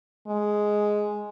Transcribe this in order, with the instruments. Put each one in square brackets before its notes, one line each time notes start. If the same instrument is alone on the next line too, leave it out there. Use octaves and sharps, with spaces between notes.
[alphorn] G#3